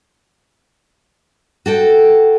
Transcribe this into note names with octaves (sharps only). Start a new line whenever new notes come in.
F#4 A4 G5